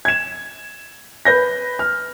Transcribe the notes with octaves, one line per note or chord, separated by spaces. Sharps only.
G#6 E7
B4 G6 A#6
F6